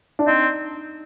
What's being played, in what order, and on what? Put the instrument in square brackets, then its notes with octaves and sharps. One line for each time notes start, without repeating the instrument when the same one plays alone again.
[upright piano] D4
[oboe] C4 [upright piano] D#4